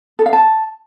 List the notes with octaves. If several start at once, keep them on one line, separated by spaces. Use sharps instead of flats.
A4
F5
A5